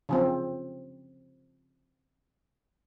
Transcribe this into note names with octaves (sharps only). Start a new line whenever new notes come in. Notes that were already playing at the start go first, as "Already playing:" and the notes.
C#3 F3 C4